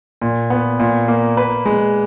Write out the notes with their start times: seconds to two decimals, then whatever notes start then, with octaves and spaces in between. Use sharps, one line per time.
0.22 A#2
0.50 B3
0.80 A#2
1.08 A#3
1.37 B4
1.66 G#3